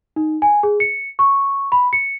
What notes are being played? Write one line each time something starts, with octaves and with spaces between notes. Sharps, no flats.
D#4
G#5
G#4
C#7
C#6
B5
C#7